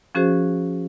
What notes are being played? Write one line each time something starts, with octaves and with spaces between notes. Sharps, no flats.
F3 C#4 F#4 G#4 C5